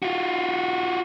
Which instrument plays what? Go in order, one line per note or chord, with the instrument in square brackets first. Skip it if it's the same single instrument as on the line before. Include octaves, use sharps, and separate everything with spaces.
[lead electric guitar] F4 F#4